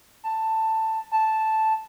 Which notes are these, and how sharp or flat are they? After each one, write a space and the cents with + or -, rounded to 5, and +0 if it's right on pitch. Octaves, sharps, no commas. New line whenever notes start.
A5 +10
A5 -5